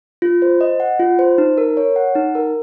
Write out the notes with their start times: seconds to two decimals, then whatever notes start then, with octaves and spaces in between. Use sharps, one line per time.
0.22 F4
0.42 C5
0.61 D#5
0.80 F#5
1.00 F4
1.19 C5
1.38 D#4
1.58 A#4
1.77 C#5
1.96 F#5
2.15 D#4
2.35 A#4